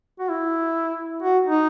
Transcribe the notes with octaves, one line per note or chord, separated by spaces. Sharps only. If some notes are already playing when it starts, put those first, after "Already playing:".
F#4
E4
F#4
D#4